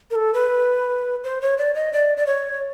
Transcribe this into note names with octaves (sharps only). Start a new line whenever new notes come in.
A#4
A4
B4
C5
C#5
D5
D#5
D5
D5
C#5